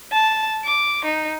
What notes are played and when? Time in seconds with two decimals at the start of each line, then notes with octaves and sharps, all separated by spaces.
0.12 A5
0.64 D6
1.05 D#4